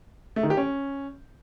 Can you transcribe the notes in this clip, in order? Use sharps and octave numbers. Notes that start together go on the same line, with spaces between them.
A3
D#3
G4
C#4